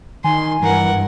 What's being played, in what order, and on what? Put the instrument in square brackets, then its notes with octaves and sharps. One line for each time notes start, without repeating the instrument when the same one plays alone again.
[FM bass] D#3 [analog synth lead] G#5 [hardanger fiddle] C6
[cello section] G2 [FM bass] E3 [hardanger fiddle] A#4 F#5